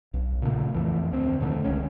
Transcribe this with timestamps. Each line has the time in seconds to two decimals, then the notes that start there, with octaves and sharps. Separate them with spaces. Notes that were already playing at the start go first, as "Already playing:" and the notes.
0.14 B1
0.42 A#2 C#3 E3 A3
0.74 F2 E3 A3
1.12 D2 C4
1.41 A2 D3 D#3 A3
1.64 D#1 C#2 G#3 C#4